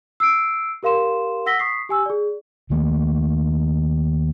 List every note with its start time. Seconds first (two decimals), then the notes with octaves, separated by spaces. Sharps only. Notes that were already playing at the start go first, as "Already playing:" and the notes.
0.20 E6 C7 D7
0.83 G4 A#4 F5 C6 E7
1.46 F#5 E6 A#6 B6 G7
1.59 C#6 D#6 B6 C7
1.89 G4 G#5 E6
2.06 G#4 D5
2.70 D#2 D#3 A3 A#3